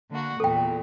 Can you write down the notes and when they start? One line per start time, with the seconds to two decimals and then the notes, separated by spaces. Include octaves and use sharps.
0.10 D3 A#3 F#4
0.40 E2 A#2 A4 G5